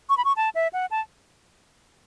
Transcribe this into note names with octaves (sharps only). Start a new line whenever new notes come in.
C#6
B5
C#6
A5
E5
F#5
A5